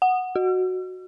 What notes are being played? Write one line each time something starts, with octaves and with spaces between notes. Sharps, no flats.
F#5
F#4